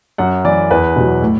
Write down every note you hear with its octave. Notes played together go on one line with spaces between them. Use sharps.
F#2 F#5
E3 D5
E2 B4
B2 F#3
A2